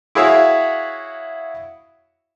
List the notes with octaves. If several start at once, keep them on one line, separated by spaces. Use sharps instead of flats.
E4 F#4 G#4 C#5 E5 F5